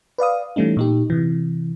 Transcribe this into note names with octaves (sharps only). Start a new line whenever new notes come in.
B4 D5 F5 D#6
E3 G3 A3 C#4 D#4
A#2 D#4 G4
C3 E3